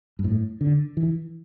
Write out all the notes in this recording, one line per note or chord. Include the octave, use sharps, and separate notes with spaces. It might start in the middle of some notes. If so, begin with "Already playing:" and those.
G2
A2
D3
E3